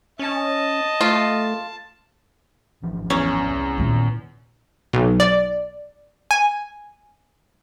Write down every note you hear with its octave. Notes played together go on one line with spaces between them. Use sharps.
C#4 D#5 A5
A3 F4
G#1 E3 F3
E2 C#4
C2
D#2 A#2
B1
D5
G#5